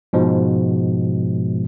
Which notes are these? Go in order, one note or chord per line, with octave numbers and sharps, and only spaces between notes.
G#2 B2 F3 G#3